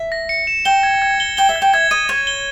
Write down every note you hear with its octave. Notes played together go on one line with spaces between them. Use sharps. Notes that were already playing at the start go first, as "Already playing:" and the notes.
Already playing: E5
A#6
C#7
E7
G5 G7
G#6
G#6
G7
G5 G7
E5
G#6
G5
E5 G#6
D#5 D#7
C#5 G#6
G7